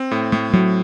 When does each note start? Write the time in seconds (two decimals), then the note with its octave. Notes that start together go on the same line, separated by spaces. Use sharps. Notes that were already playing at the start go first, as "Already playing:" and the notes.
Already playing: C4
0.11 A2
0.32 A2 A3
0.53 A2 F#3